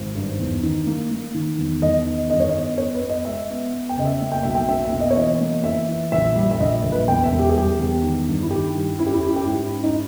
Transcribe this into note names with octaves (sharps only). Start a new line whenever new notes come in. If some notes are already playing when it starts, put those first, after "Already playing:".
Already playing: G#1
G2
E2
D#3
A#3
A#3
D#3
E2
E2 D#5
D#3
G2 D#5
C#5
D#5
B3
B3 C#5
B4
B3
D#5
G#3 E5
B3
B3
G5
C#3 D#5
E5
A#3
G5
B1 E5
G5
A#3 E5
E5
B2
D#5
C#5
E3 D#5
A#3
E3 E5
E3
A#1 E5
G3
E5
A#1 D#5
A#1
B4
E2 G5
E5
E1
G4
G#4
G3 G4
E2
D#3
G2
E4
D#3 G4
G2
C#4 E4
G4
E4
C#4 G4
E4
G4
G#2 E4
C#4
D#4